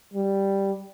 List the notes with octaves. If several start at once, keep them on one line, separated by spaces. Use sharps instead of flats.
G3